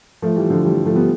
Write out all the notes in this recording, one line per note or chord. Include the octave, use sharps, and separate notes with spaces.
F3 A3
E3 G3
D3 F3
E3 G3
F3 A3
G3 B3